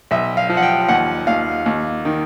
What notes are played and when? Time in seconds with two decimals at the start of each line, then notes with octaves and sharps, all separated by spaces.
0.11 B1 E5
0.37 F5
0.49 F3
0.57 F#5
0.63 G5
0.88 D#2 F#5
1.27 D#2 F5
1.66 D#2
2.05 D#3